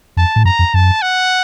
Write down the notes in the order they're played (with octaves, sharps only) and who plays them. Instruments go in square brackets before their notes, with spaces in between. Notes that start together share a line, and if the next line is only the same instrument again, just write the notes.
[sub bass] F2 [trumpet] A5
[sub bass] A2
[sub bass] F#2 [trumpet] A#5
[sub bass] F2
[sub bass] F#2 [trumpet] A5
[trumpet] F#5